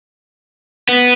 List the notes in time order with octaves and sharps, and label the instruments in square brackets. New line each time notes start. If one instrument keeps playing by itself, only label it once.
[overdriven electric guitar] B3